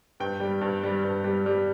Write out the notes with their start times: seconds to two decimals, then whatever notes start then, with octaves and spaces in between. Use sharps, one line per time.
0.20 G2 G5
0.40 G3
0.61 G2
0.83 G3
1.04 G2
1.24 G3
1.46 G3